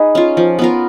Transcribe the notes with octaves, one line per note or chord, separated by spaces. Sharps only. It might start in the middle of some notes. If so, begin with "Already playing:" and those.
Already playing: D#4 G#4 B4
C#4 F4
F3
B3 F4 A#4